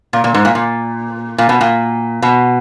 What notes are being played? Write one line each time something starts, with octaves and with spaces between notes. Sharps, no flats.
A#2
A#2
G#2
A#2
A#2
A#2
B2
A#2
B2